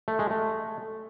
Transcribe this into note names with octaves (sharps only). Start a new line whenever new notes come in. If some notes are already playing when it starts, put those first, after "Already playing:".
A3
G#3
A3